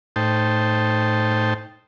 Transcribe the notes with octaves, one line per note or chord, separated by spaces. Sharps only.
A2 D#4 C5 G5 A5